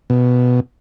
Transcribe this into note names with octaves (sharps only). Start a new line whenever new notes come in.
B2